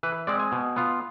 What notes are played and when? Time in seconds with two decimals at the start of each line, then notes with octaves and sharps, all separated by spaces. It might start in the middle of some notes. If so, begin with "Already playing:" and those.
0.03 E3 B4
0.27 G#3 C4 D5
0.40 G#5
0.52 B2
0.76 B3 F4